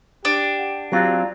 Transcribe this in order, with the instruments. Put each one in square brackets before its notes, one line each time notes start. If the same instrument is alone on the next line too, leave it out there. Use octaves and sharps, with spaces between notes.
[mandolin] D4 [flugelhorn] G4
[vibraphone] F#5
[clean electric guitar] F#3 C4 F4 [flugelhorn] G4 [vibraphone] D5 F5 A#5